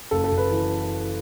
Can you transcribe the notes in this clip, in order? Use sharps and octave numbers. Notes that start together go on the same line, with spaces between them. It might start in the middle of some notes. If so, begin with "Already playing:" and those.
F#1 A4
A4
F#1
B4
E3